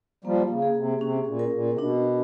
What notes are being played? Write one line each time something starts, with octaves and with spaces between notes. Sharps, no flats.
F3 G3 A#3
C#3
G#4
C3
C3 C#4
A#2
A#4
A#2
C3
B2 D4